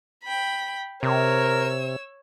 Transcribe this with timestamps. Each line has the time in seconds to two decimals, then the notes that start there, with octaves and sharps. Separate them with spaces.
0.24 G5 B5
1.03 C3 A#4 C#5 E6